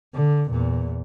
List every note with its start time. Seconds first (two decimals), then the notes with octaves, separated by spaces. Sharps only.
0.15 D3
0.50 E2 A#2